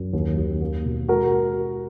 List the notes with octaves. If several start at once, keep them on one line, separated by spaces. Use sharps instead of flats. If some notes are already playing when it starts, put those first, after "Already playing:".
Already playing: F#2
D#2
D#2
A#3
B2
G#3 F#4 A#4